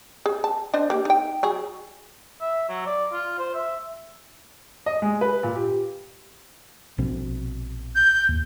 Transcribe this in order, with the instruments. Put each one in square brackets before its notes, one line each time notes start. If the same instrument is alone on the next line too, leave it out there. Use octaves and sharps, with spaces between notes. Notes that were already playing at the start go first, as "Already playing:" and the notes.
[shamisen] G#4
A5
D4 C5 D#5
A#3 G4
D#4 G5
F#3 G#4
[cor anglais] E5
F#3
D5
F4
C5
E5
[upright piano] D#5
G#3
B4
A#2
G4
[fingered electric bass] A#1 B2 C4
[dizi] G6
[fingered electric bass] D#2